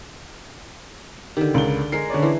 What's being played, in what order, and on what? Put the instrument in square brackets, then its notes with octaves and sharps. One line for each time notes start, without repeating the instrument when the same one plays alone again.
[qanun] D3 D#3 [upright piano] G4
[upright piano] C#2 A#4 G7 [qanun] D5
[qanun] G#3 A#4 [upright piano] C7
[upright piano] D3 C#4 D5
[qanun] E3